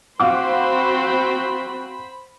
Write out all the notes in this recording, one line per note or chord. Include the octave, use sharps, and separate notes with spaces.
C4 F#4 C5 F5 F#5 B5 D6